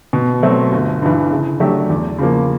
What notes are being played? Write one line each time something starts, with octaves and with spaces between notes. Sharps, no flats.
B2
F#3 A3 C4
G1
G2 E3
C#3
F#3 A3 D4 G4
E2
C#3 F3 A#3